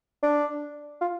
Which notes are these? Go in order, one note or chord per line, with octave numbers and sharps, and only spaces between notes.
D4
F4